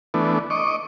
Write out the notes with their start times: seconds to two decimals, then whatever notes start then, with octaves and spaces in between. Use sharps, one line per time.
0.14 E3 A3 B3 D4
0.50 D#5 C#6 D6